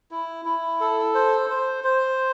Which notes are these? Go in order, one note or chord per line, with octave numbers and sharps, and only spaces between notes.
E4
E4
A4
C5
C5
C5